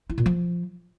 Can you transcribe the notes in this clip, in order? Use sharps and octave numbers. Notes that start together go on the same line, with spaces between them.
E4
A#2
F3